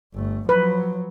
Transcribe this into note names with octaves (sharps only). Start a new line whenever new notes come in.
G1 A3
F3 F#3 B4